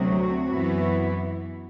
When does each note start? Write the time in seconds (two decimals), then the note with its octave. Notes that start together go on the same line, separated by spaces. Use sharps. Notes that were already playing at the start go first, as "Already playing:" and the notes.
Already playing: D2 C3 F#3 C4 F#4
0.48 F#2 E3 B3 E4